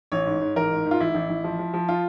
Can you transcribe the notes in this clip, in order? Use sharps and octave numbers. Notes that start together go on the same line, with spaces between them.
A1 C#5
G#2
G#2
A1 A#4
G#2
G#2
F4
A1 E4
A1
A1
F3
F3
F3
F4